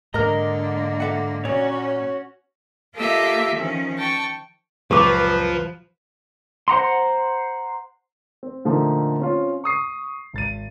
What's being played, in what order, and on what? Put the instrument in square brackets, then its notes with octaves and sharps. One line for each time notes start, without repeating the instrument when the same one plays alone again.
[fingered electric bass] G#2 [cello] D3 A#3 [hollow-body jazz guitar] A#4 A#5 [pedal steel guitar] D#5 F6
[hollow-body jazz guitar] A4 E5 F#5
[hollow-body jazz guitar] A#2 [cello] C#4 F#4 [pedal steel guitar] C#5
[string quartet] A#3 F4 G4 A4 D#5 E5
D#3 F3 C#4
G5 A5 C#6
[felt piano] C#2 F#2 A#2 [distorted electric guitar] F3 [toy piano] G4 D6 [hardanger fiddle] B4
[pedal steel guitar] C5 F#5 A#5 C6
[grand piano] C4
A#2 D3 F3 A3 A#3 D#4
C4 C#4 F4
C#6 D#6 C7
G#1 A6 D#7